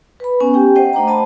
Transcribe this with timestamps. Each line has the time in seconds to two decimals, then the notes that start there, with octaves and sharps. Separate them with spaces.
0.20 B4 B5
0.40 B3 C#4 G#5
0.54 G4 G5
0.76 C5 D#5 F#5 G5
0.93 A3 D4 C5 A#5
1.07 D4 D#5 A5 B5